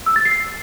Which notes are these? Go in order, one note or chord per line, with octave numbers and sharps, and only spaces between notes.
E6
A6
C7